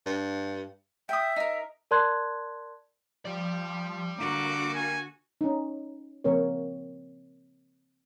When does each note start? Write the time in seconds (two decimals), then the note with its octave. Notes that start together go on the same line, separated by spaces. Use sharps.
0.06 G2
1.09 E5 G5 D#6
1.36 D#4 A#4
1.91 A#4 D5 A5 C6 F#6 G#6
3.25 F3 G4 D5
4.18 D3 A#3 F#4 D6
4.75 G#5
5.41 C#4 D#4
6.24 C#3 F3 A#3 C4 A#4 C#5